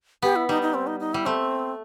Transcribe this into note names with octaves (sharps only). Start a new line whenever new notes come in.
B3 G4
E4
G3 D#4
D#4
C4
D#4
D#4
G3 E4
A3 C4